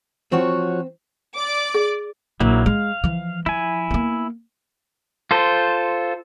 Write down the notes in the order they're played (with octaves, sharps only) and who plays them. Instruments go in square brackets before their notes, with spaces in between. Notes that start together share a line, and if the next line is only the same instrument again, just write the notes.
[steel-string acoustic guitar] F3 F#4 C#5 [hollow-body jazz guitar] C4
[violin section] D5 D6
[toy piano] G#4
[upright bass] A#1 A#2 [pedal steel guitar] F#3 A#3 E4
[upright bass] G#3 [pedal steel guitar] F5
[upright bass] E3 F3
[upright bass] F3 [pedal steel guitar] E4 G#5
[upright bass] A#3 B3
[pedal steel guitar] F4 A4 C5